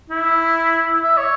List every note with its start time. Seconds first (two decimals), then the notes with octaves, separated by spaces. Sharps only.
0.10 E4
1.03 E5
1.17 C#5